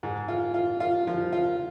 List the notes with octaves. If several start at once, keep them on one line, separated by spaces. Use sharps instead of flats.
G#2
F4
F4
F4
F3
F4